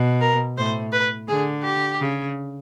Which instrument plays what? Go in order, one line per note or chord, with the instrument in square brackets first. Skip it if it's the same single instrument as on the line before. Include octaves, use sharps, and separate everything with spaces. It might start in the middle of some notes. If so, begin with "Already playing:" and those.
Already playing: [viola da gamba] B2
[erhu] A#4
[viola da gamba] A2 [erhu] C5
[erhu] B4
[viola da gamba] D3 [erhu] G#4
[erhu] G4
[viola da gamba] C#3